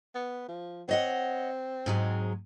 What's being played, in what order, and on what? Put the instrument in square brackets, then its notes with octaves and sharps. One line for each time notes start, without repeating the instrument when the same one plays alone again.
[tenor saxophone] B3
F3
[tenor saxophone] C4 [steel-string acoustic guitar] C#5 D#5 F#5
[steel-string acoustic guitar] G#2 F#3 G#3